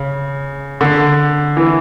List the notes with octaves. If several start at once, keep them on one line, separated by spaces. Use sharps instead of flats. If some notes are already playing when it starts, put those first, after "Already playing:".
Already playing: C#3
D3
E3